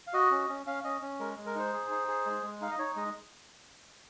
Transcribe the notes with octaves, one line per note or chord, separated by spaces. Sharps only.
F5
F#4 D#5
C#4
C#4
C#4 F5
C#4 D#5
C#4
G#3 A#4
G#3
A#4
D#4 C5
G#4
D#4
G#4
G#3
G#3
D#4 F5
D#5
D#4 C#5
G#3 D#5